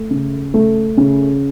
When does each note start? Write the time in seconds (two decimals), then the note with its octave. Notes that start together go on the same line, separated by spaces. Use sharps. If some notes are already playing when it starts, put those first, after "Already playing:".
Already playing: A3
0.11 C#3
0.54 A3
0.97 C#3